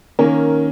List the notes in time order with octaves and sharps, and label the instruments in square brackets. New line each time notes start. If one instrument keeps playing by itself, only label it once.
[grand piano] D#3 A#3 C#4 [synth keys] A#4